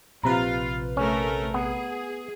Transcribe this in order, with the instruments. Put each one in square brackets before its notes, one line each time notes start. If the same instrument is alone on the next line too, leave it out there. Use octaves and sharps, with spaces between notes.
[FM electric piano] A#1 C3 B4 [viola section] F4 F5 [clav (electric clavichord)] A#5
[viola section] A3 A#4 [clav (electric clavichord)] C#4
[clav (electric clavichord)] B3 [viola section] G#4